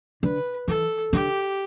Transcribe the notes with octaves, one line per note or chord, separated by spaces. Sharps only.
D3 B4
E3 A4
D3 G4